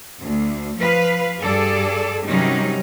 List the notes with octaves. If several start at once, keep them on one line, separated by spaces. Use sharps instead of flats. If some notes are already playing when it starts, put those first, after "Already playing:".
D2
F3 B4 F5
G2 G#4 A4 D5
C3 D#3 F#3 G3 C#4 D#4